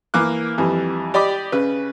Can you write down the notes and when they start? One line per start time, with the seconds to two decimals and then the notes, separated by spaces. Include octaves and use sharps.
0.14 E3 A#3 D6 F#6
0.58 F2 E3 G3
1.14 G4 D5 D#5 B5 D6
1.52 C#3 B4